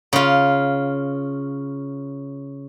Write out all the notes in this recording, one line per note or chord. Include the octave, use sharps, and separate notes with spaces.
C#3 F4